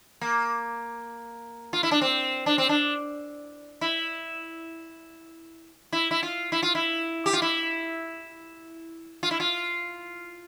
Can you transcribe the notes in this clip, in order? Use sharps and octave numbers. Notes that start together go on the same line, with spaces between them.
A#3
F4
E4
D4
C4
D4
C4
D4
E4
E4
E4
F4
E4
F4
E4
G4
F4
E4
F4
E4
F4